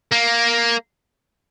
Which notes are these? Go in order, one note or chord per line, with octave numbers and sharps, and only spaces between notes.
A#3